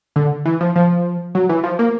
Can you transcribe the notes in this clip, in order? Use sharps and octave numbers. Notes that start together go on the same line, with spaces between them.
D3
E3
F3
F3
F#3
E3
F3
A#3